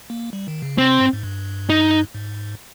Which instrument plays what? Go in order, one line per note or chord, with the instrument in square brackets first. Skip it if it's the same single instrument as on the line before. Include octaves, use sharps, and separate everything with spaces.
[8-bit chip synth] A#3
G3
D#3
C#3
[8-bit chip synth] C3 [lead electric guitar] C4
[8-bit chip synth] G#2
G#2
G2
[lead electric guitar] D#4
[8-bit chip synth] G#2